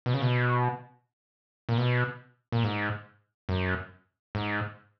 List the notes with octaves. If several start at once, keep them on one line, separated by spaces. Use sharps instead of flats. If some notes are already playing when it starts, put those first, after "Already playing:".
B2
C#3
B2
A#2
B2
A#2
G#2
F#2
G#2